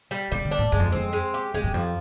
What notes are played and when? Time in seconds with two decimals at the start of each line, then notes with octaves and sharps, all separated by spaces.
0.11 G3
0.32 C3 G3
0.45 D3
0.51 D4
0.59 G#2
0.72 G2 G#3
0.80 F2
0.92 F2 C4
1.13 G#3
1.34 G4
1.54 F2 G#3
1.64 G2
1.74 F2 F3